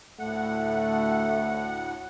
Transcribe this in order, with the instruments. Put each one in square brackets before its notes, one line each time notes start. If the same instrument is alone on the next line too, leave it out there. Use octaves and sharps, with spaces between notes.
[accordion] D2 A2 F#5 [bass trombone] A3